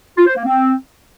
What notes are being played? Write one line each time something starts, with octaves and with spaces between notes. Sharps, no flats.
F4
C5
A#3
C4